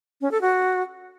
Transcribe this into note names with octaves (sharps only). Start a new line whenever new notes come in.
C#4
A4
F#4